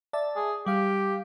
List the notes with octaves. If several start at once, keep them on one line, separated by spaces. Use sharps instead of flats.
D5 E5 A5
G#4
G3 G4 F5